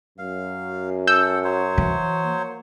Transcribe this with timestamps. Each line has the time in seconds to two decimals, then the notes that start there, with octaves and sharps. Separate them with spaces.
0.18 F#2 F5
1.07 A4 F#5 E6 G6
1.44 F#3 C5 C#5
1.78 E3
2.24 A#3